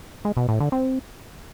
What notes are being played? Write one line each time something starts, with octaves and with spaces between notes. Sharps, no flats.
G#3
B2
A2
D3
C4